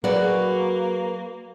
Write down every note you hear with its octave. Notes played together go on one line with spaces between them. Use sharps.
F#3 A#3 F#4 G#4 B4 D5